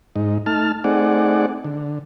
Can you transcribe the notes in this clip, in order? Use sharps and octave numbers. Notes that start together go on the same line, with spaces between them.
G#2 D#4
A3 D#4 A5 F6
A3 C4 D#4 G#4 D5 F#5
D3